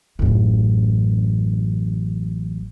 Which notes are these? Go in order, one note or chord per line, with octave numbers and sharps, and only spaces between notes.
A1 F#2